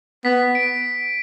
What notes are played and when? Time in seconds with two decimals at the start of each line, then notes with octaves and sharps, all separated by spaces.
0.25 B3 B6
0.55 D7